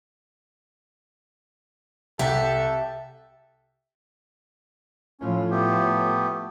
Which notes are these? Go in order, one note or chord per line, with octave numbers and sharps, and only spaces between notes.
C2 G4 A4 E5 F#5 A5
A2 F3 C#4
A3 B3 G4